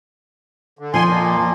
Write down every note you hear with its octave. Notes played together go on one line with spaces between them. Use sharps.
D3
F2 F3 G#5 C6
A#2 A#3